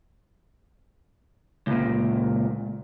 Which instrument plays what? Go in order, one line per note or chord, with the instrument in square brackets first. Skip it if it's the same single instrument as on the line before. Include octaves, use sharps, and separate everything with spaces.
[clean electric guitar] C#2 A#2